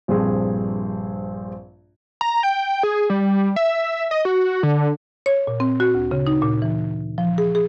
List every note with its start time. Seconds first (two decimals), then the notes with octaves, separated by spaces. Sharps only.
0.08 A#1 G2 C4 G#4
2.21 A#5
2.43 G5
2.83 G#4
3.10 G3
3.56 E5
4.11 D#5
4.25 F#4
4.63 D3
5.26 C#5
5.47 A#2
5.60 C4
5.80 F#4
5.94 D2
6.11 C#3
6.27 D#4
6.42 A#2
6.62 E3
7.18 F3
7.38 G#4
7.55 G#4